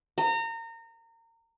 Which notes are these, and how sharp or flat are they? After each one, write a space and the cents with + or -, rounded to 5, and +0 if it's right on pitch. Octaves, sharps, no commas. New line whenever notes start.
A#5 -30